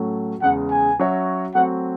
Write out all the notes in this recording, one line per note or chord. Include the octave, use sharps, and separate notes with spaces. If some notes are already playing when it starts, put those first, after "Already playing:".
Already playing: A2 F#3 A3 C#4
E2 C#3 G#3 F#5
G#5
F#3 C#4 F#4 C#5 E5
F#3 A3 C4 F#4 F#5